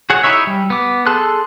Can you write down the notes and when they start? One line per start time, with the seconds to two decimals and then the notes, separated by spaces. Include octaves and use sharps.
0.10 F#4 G#4 C#5 F#5
0.23 D#4 E4 C#5 E5
0.47 G3
0.70 B3 D6
1.06 G#4 A4 A5 C6 F#6